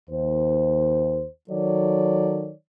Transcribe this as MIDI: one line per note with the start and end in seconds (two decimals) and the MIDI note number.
0.10 1.26 39
0.10 1.26 72
1.50 2.52 51
1.50 2.52 54
1.50 2.52 69
1.50 2.52 73
1.50 2.52 74